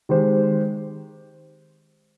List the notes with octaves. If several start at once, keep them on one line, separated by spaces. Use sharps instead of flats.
D#3 G#3 C4 G4 C5